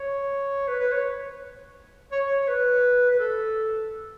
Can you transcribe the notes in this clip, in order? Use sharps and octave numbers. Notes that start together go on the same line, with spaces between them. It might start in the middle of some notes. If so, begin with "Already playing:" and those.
Already playing: C#5
B4
B4
C#5
C#5
C#5
C#5
B4
B4
A4